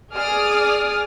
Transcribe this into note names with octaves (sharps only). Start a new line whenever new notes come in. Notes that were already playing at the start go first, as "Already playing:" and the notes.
G#4 D5 D#6 F6